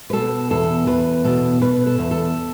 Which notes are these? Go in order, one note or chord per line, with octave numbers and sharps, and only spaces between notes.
B4
B2 A4
E2 A4
E2 B4
B2 A4
B2 B4
A4
E2
A4